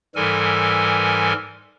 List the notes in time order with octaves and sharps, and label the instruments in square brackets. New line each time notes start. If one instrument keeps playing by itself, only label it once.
[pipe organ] G#2 E3 G3 A4 A#4 G#5